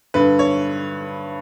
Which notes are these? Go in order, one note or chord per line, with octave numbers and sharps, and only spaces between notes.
G2 D3 B4
C#5